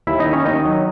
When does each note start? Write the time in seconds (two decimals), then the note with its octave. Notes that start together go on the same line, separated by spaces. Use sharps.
0.07 D#2 E4 E5
0.20 D#4 D#5
0.26 D#3
0.33 C#4 C#5
0.45 D#3 D#4 D#5
0.65 F#3